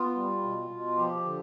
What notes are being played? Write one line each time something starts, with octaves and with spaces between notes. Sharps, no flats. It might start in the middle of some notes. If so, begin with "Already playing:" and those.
Already playing: B3 F4
G3
B2
B2
F3 G4
D3